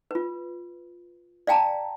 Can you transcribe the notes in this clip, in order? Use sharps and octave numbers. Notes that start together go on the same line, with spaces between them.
F4 B4
D5 F5 G5 A5 A#5